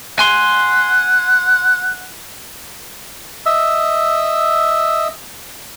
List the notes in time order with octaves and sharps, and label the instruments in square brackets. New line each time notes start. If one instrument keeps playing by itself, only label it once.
[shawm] F#5 [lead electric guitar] G#5 C6
[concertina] D#5 E5 E6